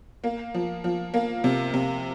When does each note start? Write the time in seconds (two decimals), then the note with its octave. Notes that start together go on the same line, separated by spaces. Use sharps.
0.24 A#3
0.54 F3
0.84 F3
1.14 A#3
1.44 C3
1.74 C3